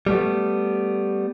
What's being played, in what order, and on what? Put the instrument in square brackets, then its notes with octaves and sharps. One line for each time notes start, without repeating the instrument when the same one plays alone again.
[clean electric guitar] G3 A3 B3